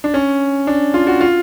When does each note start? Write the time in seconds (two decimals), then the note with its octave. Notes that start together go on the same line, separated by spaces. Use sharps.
0.04 D4
0.14 C#4
0.67 D4
0.94 F4
1.07 F#4
1.21 F4